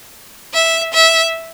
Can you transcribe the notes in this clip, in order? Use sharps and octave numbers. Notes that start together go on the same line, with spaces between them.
E5
E5